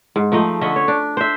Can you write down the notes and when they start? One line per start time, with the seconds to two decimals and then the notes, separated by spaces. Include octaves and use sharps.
0.16 G#2
0.32 F3 A3 D#4 D#5
0.61 D3 C#4 D#5 E5
0.76 C#5
0.88 D4
1.17 C5 E5